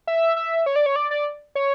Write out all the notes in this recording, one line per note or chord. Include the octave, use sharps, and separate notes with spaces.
E5
E5
C#5
D5
C#5
D5
D5
C#5